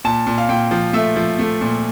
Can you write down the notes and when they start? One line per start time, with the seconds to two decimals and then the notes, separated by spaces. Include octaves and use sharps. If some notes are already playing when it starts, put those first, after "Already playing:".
0.04 A#2 A5
0.27 A#2
0.38 F5
0.49 A#2 G5
0.71 F3
0.93 A3 E5
1.16 F3
1.39 A3
1.61 A#2